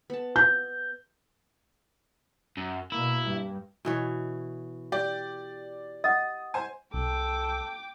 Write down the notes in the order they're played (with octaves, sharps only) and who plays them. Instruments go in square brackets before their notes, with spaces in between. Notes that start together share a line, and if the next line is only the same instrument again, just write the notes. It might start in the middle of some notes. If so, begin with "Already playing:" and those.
[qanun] B3 A5
[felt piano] G6
[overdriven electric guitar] F#2
[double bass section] B2 A#3 [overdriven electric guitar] E4
[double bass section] G2
[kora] B2 E3 C#5
[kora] G4 [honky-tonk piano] D5
[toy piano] D#5 F#5 [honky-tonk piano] D#6
[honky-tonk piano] C5 G#5
[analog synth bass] C2 [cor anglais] A4 [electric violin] G5 D6